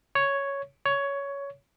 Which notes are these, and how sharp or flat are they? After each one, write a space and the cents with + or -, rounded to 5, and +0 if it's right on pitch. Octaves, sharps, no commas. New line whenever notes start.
C#5 +0
C#5 +10